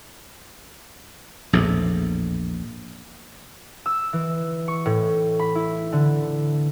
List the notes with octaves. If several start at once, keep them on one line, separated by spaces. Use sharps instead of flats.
A#1 E2 A2
E6
E3
C#6
A2
B5
E4
D3